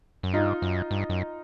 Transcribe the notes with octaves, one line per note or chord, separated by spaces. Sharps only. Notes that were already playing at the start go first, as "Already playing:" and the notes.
F#2
G2 D#4 F4
F#2
G2
F#2